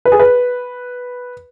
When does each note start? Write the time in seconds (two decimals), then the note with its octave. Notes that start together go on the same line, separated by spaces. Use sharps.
0.05 B4
0.12 G#4
0.19 B4